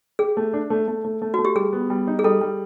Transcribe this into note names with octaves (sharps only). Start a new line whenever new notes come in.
G4 G#4
A3
D4
A3
A3
A3
A3
A3 F#4
G4
G3 G#4
B3
G3
D#4
G#4
G3 A4
G3